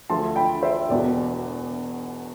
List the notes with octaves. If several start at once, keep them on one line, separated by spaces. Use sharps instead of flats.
D2 D3 F3 A3 A5 C6
G5 B5
C5 E5
E1 E2 B2 D5